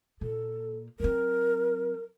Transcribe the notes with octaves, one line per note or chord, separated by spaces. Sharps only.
A#2 A4
F#3 C4 A#4